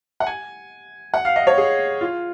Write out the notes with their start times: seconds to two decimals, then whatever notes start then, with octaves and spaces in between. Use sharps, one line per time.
0.20 F#5
0.27 G#5
1.14 F#5
1.25 F5
1.36 D#5
1.47 C#5
1.58 G#4
2.01 F4